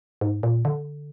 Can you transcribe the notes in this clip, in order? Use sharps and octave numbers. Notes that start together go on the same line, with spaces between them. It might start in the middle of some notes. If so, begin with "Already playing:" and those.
G#2
A#2
D3